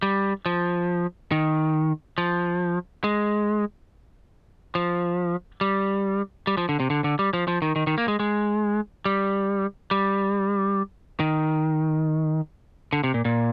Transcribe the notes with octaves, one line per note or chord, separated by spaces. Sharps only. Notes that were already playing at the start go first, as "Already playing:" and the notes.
G3
F3
D#3
F3
G#3
F3
G3
G3
F3
D3
C3
D3
D3
G3
F3
F3
D#3
D#3
D#3
A#3
G#3
G#3
G3
G3
D#3
D3
C3
A#2
A#2